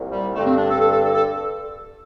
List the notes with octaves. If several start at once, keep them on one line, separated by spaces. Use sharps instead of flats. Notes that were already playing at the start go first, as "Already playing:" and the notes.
Already playing: C2 A#2
G3
G2 D3 A3
C4
D4
A4
A4
A4
A4
A4